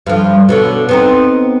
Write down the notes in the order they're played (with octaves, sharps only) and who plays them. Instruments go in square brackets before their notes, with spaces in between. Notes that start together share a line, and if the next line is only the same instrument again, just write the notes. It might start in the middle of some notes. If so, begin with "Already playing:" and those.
[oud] G2 D3 F3
B2 D3 C#5
B3 C4 D#4